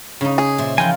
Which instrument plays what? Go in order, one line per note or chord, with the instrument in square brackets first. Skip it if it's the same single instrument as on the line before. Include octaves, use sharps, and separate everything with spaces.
[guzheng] C#3 D#4 [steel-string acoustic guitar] C#4
[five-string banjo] G#4
[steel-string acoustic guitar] A#2 C5 E5
[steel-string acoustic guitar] E3 F3 [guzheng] F4 A#4 [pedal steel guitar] G5 G#5